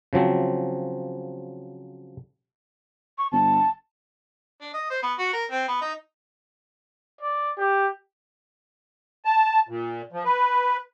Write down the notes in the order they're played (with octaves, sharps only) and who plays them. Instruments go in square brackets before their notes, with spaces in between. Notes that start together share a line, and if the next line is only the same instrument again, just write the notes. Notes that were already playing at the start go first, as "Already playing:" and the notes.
[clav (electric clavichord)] C#3 F3 F#3 C4
[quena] C#6
[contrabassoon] G1 [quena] A5
[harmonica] D4
D#5
C5
B3
F#4
A#4
C4
B3
D#4
[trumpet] D5
G4
[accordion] A5
A#2
F3
B4